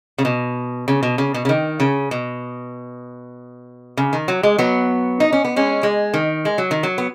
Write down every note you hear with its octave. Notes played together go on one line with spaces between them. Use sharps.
C#3
B2
C#3
B2
C#3
B2
C#3
D#3
C#3
B2
C#3
D#3
F#3
G#3
F#3 B3
D#4
C#4
B3
G#3 C#4
G#3
D#3
G#3
F#3
D#3
F#3
B3